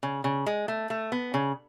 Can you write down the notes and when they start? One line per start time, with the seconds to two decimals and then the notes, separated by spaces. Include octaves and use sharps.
0.03 C#3
0.24 C#3
0.46 G#3
0.68 A3
0.90 A3
1.12 B3
1.34 C#3